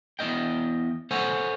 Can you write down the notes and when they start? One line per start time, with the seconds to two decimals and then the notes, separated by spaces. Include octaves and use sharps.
0.19 E2 E3 D#5 G5
1.11 A4 C5 C#5 F#5 G#5